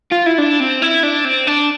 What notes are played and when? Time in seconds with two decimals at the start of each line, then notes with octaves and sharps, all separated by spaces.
0.11 F4
0.26 E4
0.38 D4
0.60 C4
0.82 E4
1.03 D4
1.25 C4
1.47 D4